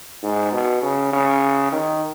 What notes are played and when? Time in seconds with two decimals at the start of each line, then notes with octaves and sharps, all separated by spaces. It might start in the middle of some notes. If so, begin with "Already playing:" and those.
0.23 G#2
0.53 B2
0.82 C#3
1.13 C#3
1.72 D#3